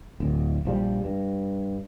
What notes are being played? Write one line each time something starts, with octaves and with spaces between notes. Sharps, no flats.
D1
A#1 F3 G3
G2